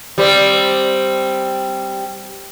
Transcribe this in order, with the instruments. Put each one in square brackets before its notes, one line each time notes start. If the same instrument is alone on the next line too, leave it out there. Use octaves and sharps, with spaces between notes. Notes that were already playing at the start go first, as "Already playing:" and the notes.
[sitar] G3 C4